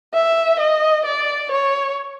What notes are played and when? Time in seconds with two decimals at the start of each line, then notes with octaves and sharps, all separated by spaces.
0.14 E5
0.59 D#5
1.05 D5
1.51 C#5